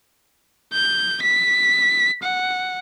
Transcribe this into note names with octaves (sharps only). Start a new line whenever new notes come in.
G6
B6
F#5